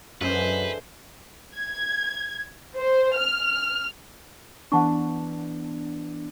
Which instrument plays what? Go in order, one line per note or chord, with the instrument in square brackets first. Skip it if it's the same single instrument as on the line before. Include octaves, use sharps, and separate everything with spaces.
[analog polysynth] F#2 [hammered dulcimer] D3 E3 G#3 [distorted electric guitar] B4 [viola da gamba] C5
[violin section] G#6
C5
F6
[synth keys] E3 B3 D4 [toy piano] F#5 A5 C#6